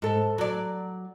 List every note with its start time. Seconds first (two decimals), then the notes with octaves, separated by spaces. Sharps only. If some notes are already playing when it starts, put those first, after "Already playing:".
0.02 G#2 A4
0.38 F#3 D5